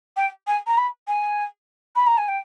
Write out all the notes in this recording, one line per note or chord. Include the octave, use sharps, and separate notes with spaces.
G5
G#5
A#5
B5
G#5
B5
A#5
G#5
G5